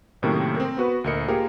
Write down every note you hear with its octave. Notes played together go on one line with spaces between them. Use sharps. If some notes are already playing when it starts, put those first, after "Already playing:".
F#2 A2 C3 D#3 A3 A#3
C4 A#4
B3 F#4 B4
D2 A#2 A#4 D#5 C#7
A#3 F4 G4 G#4 A#4 C5